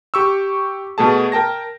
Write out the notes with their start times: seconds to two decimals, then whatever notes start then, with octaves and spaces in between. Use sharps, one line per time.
0.14 G4 C#6 E6
0.98 B2 A3 G#4 A5
1.32 A#4 G5 A5 A#6